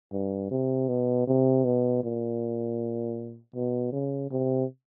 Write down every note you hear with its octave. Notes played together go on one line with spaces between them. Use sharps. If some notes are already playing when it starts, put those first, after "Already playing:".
G2
C3
B2
C3
B2
A#2
B2
C#3
C3